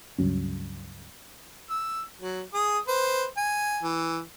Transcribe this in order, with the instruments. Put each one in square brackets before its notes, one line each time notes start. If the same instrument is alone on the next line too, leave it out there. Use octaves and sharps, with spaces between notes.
[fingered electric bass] C#2 G2 F#3 C#4
[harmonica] E6
F#3
G#4 D#6
B4 C5
G#5
E3